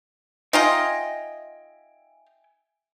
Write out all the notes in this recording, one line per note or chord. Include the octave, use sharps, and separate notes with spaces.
D#4 F4 D#5 E5 G5 G#5